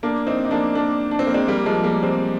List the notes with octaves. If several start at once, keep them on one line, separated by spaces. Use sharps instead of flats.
A#3 D4
C4 D#4
D#4
A#3 D4
A#3 D4
D4
C4
A#3
G#3 C4
G3 A#3
F3 G#3
G3 A#3
G#3 C4